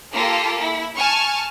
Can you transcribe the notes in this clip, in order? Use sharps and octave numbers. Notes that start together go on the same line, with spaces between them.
A#3 F4 G4 A4
E4
G#5 A5 C#6 F6